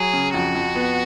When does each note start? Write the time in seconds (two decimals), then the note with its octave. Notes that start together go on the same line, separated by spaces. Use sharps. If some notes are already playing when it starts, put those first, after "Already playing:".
Already playing: F#3 G#4
0.13 C#3
0.33 F2 F#4
0.55 F2
0.75 B3